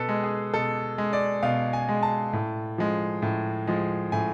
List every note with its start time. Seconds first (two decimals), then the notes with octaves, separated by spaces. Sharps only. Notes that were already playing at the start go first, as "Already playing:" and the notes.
Already playing: B2 A4 B4
0.09 G#3
0.23 G#4
0.54 B2 A4
0.98 G#3
1.13 D5
1.43 B2 F5
1.73 G#5
1.89 G#3
2.03 A5
2.33 A2
2.78 F3 G#3
3.22 A2
3.67 F3 G#3
4.12 A2 G#5